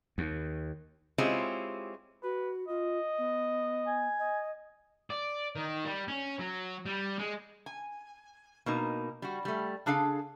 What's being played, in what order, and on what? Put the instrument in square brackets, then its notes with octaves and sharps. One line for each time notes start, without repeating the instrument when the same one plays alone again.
[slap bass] D#2
[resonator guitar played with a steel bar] G#3 C4 C#4 E4 F4 G4
[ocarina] F#4 [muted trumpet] B4
[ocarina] F4 [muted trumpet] D#5
[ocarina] B3
[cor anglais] G#5
[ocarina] D#5
[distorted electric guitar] D5
D#3
G3
C#4
F#3
G3
G#3
[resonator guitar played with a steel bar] G#5
B2 A#3 D#4
G3 F#4
G3 A3
C#3 D4 G#4 A4 F5